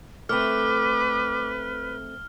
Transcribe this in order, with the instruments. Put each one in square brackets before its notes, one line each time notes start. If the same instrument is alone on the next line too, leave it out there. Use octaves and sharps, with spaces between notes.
[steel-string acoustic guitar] A3 C4 [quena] B4 [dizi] D6 [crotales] F6